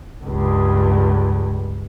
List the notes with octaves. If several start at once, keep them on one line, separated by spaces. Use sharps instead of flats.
C#2 G2